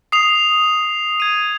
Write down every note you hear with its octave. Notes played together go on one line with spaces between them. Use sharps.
D#6 C7 F7
G#6 D#7